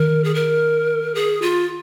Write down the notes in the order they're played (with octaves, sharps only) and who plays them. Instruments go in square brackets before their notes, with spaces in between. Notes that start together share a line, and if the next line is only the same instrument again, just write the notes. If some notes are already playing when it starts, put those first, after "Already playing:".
Already playing: [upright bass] D#3 [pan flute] A#4
[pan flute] G#4
A#4
G#4
F4